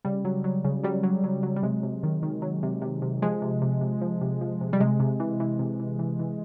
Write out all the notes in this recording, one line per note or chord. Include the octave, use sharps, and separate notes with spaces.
C#3 G3
F#3
F#3
C#3
F#3 G3
F#3
F#3
F#3
G3
C3 G#3
C3
D#3
D#3
F#3
C3
C3
C3
F3 G#3
C3
C3
C3
F3
C3
F3
C3
G3
C3 G#3
C3
E3
E3
C3
E3
E3
E3